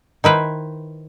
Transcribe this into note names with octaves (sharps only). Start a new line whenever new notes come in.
D#3 E4 B4 C5